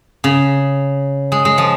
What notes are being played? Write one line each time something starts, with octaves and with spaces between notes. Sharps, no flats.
C#3
G#3
G#3
F3